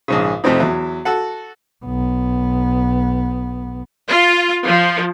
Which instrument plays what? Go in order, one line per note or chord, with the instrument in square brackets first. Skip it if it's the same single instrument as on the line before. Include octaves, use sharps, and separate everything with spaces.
[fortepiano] A#1 G#2 C#3
F2 C3 A3 C4 D#4
E2 F#3 E5
F#4 A4 F#5
[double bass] B1 B3
[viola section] F4
F3